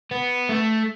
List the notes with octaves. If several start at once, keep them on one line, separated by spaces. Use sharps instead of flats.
B3
A3